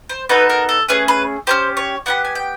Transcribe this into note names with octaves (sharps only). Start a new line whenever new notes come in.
C5
B3 D#4 F#4 A4 B4
A#4
A4
A3 C#4 G#4 B4
B4
C#4 E4 G4 C5
C#5
B3 E4 G4 F#5
G#5
G5